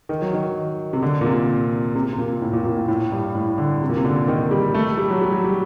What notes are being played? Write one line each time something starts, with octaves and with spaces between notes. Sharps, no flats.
D#3
F#3
D#3
C3
D3
A#2
C3
C3
C3
A#2
A2
A#2
A#2
A2
A2
G2
A2
D3
C3
A#2
C3
D3
D#3
G3
A3
G3
F#3
G3
F#3
G3